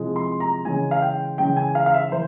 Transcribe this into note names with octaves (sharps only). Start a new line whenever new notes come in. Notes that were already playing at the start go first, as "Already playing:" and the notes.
Already playing: C3 F3 G#3 E4
C6
A#5
C#3 E3 G#3 C#4 G#5
F5
G5
C#3 E3 G#3 C#4 G5
G#5
F5
F5
E5
E3 C5